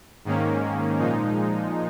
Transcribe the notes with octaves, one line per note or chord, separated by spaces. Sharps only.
G#2 D#3 A#3 C#4
A#2 F3 G#3 D#4